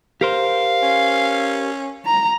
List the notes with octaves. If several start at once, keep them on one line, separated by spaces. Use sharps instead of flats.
G4 A#4 C5 F5
C#4
A#5